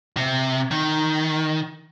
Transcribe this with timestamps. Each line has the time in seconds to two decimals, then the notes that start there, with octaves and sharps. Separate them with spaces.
0.17 C3
0.71 D#3